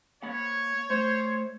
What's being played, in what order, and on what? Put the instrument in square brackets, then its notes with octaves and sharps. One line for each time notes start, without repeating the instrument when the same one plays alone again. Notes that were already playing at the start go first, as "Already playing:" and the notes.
[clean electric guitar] A#3 B5 [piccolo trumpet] C#5
[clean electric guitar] A3 [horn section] C5